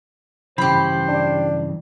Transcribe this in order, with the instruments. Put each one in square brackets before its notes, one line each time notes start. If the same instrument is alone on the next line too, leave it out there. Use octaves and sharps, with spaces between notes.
[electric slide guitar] G2 C#3 E3 [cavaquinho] G4 B5 [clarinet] C5
[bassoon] D4